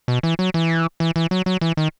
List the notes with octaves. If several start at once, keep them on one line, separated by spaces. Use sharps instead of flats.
B2
E3
F#3
E3
E3
E3
F#3
F#3
E3
D#3